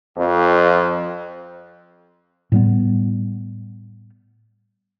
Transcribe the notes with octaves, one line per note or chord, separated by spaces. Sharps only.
F2
A2 G3 B3